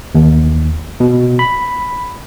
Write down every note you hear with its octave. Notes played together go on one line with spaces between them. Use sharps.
D#2
B2
B5